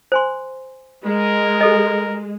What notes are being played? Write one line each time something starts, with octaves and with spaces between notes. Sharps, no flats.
C5 G#5 C6
G#3 A#4
G4 A4 D#5